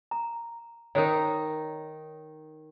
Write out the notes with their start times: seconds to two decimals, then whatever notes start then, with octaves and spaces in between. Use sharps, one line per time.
0.11 A#5
0.95 D#3 D#4 A#4 C5 C#5